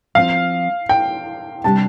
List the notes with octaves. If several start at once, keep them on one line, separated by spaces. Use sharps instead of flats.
F3 C4 F4 F5
G5
C3 G3 D4 G4 A5